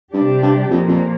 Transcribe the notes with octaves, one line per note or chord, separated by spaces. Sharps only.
G2 C3 G3 D4 G4
G2
F2 A#2 F3 A#3
F2